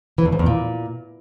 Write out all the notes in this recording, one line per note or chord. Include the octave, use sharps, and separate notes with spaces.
E3
E2
G#2
E2
A#2